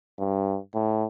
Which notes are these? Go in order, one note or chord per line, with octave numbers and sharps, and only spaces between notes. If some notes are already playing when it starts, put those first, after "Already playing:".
G2
A2